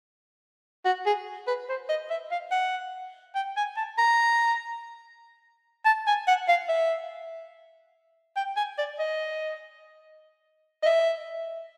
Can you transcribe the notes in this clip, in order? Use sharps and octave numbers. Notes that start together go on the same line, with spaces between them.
F#4
G#4
B4
C5
D#5
E5
F5
F#5
G5
G#5
A5
A#5
A5
G#5
F#5
F5
E5
G5
G#5
D5
D#5
D#5
E5